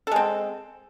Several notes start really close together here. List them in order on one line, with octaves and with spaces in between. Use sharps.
A4 G#3 C4